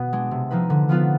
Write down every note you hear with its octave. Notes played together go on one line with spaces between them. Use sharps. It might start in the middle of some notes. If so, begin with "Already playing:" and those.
Already playing: B2 B3
G#3 D4
C3
F3 C4 D#4 B4
D3
F3 B3 F4 B4